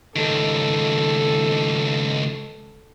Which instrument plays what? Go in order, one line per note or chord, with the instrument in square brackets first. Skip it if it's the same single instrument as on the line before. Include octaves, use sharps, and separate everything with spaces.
[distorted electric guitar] C#2 D#3 [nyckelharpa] A4